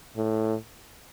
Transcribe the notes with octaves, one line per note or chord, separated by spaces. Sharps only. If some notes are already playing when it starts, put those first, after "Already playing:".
A2